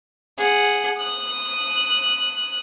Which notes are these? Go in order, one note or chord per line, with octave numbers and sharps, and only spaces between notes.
G#4 F#5
D#6 F#6